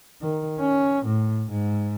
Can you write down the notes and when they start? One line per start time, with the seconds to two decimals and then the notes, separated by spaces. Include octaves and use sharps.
0.22 D#3
0.60 C#4
1.06 A2
1.50 G#2